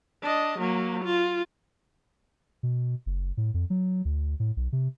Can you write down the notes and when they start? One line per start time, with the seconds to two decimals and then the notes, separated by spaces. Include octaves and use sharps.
0.23 D4 D#5
0.59 F#3 A#3
1.04 F4
2.63 B2
3.06 F#1
3.37 A2
3.54 F2
3.70 F#3
4.05 D2
4.40 A2
4.57 B1
4.73 C3